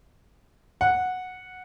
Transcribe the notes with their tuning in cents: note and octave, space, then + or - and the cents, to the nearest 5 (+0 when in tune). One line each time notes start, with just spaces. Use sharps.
F#5 -10